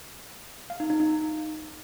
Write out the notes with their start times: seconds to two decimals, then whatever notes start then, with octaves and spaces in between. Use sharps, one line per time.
0.70 F5
0.80 D#4
0.90 D#4
1.00 D#4